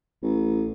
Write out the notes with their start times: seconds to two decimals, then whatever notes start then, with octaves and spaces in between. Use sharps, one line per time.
0.23 A1